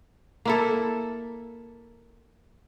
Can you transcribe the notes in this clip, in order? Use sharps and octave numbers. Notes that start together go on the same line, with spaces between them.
A#3 E4 A4